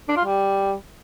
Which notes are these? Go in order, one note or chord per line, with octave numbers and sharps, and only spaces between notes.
D4
F4
G3